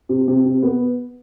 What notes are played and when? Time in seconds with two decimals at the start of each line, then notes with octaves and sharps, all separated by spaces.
0.09 C3
0.28 C3
0.45 C3
0.63 B3